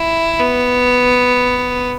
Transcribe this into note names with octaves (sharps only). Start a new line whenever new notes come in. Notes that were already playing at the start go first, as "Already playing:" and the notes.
Already playing: E4
B3